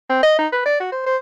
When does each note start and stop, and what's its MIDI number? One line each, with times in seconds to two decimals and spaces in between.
0.09 0.21 60
0.23 0.35 75
0.39 0.47 63
0.52 0.62 71
0.65 0.80 74
0.80 0.91 66
0.92 1.06 72
1.06 1.16 72